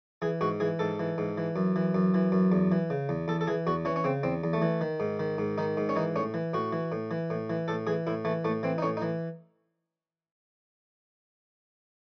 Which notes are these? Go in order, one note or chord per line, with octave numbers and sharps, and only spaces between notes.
E3 G#4
G#2 F#4
E3 G#4
G#2 A4
E3
G#2
E3
F#2
E3
F#2
E3
F#2
E2
E3
C#3
E2
E2 A4
A4
E3 G#4
E2 F#4
E3 C#4
C#4
C#3 C4
E2 C4
E2
A3
E3
D#3
G#2
D#3
G#2
D#3 D#4
G#2
C#4
E3 D#4
A2 C#4
E3
A2 F#4
E3
A2
E3
A2
E3
A2 A4
E3 G#4
A2 E4
E3 A3
A2 A3
E3 C4
D#4
A2 C#4
D#4
E3